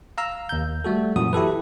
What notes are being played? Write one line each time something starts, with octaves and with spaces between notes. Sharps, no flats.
F5 A#5 E6
D#2 G6
G3 A3 F#4 A4
F#2 A#2 E3 F#4 D#6
E4 G4 A4 B4